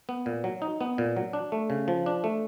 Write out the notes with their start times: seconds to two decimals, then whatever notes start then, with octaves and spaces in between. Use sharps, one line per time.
0.09 B3
0.26 A#2
0.44 F#3
0.62 D#4
0.81 B3
0.98 A#2
1.17 F#3
1.33 D4
1.52 A3
1.70 C#3
1.88 F3
2.06 D4
2.24 A3